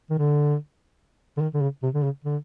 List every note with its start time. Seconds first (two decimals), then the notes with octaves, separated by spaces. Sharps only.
0.10 D#3
0.18 D3
1.37 D3
1.41 D#3
1.54 D3
1.61 C#3
1.83 C3
1.94 D3
2.03 C#3
2.24 D3